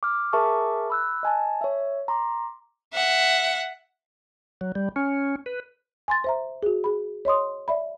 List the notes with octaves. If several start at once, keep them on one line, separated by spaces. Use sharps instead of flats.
D6 F6
G#4 A#4 E5 A5 C#6 D6
B5 E6 F#6
D#5 G#5 A5
C#5 E5
A#5 C6 D6
E5 F#5
F#3
G3
C#4
B4
G#5 C6 A6
C5 E5 A#5
F#4 G#4
G#4 B5
C#5 D#5 C6 D#6
D5 E5 B5